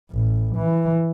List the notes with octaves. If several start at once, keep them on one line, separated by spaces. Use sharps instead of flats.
A1
E3